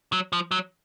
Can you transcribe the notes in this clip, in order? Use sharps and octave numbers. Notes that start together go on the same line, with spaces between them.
F#3
F3
F#3